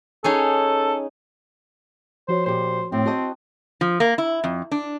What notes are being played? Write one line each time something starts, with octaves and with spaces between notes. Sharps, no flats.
C#4 D#4 G#4 A4
F3 F#4 C5 C#5
A#2 G4 C5
A2 C4
F#4 C5 D#5 G5 A5
F3
A#3
E4
F2
D4